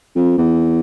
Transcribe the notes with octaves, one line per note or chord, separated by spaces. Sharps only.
F2
E2